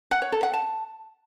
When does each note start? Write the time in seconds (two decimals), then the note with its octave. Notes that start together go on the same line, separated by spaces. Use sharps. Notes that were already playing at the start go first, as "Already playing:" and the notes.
0.11 F#5
0.22 C#5
0.32 A4
0.43 F#5
0.53 A5